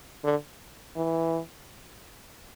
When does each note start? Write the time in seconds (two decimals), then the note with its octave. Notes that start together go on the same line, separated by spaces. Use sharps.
0.24 D3
0.97 E3